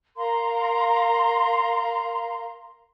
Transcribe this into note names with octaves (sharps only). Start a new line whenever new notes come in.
A#4 F5 A#5 C6